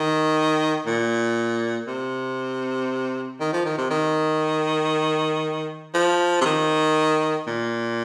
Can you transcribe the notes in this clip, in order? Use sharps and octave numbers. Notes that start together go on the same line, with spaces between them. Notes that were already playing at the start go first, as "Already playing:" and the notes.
Already playing: D#3
A#2
C3
D#3
F3
D#3
C3
D#3
F3
C3
D#3
A#2